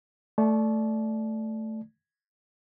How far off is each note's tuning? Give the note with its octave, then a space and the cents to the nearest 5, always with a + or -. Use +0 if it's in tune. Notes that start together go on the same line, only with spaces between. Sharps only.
A3 +0 D5 +0 A5 -35